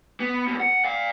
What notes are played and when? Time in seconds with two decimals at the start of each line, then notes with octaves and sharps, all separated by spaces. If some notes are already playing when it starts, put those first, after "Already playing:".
0.20 B3
0.48 C2 B2
0.60 F#5
0.84 D5 F5